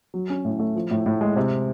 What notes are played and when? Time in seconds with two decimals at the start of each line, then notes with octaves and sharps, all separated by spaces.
0.14 F#3
0.30 C#4
0.45 A2
0.59 A3
0.76 F3
0.91 A2
1.06 A2
1.21 G#3
1.36 C3